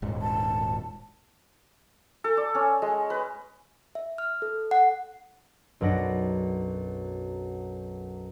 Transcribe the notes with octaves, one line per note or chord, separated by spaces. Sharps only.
D#1 G#2
A5
A4
D5
C#4
G#3
B4
E5
F6
A4
F#5
B1 F#2 D4 F#5 A#6 D7